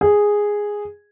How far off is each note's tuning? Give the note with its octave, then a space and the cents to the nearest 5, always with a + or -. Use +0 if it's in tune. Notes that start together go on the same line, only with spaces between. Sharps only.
G#4 -5